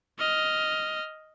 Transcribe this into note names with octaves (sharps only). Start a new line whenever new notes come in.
D#5 F6